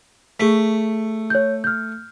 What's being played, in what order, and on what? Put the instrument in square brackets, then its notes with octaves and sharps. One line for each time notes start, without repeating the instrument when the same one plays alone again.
[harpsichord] A3 [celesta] G#4 B6
[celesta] C#5 G6
F6 G6